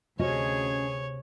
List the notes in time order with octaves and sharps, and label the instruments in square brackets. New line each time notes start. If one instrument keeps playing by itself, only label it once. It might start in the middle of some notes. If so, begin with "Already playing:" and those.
[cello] D2 G#4 [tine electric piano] C3 C5 [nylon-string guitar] C#4 F#4 D#5 [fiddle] C#5